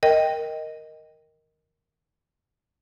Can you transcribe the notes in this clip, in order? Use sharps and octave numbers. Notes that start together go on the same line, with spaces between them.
A#4 D#5 G5